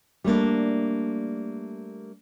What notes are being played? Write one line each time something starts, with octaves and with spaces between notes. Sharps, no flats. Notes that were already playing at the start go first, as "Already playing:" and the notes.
G3 A3 A#3 D4